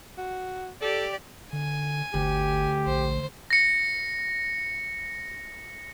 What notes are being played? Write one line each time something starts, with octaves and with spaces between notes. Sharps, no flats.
F#4
G4 A4 D5
D3 G#5
G1 D2 G4
A#1 C5
A#6 C#7